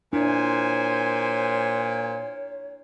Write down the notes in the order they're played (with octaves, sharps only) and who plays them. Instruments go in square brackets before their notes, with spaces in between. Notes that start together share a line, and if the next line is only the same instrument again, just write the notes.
[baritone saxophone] A#2 [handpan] D4 E4 [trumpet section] C5 G#5 [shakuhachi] C#5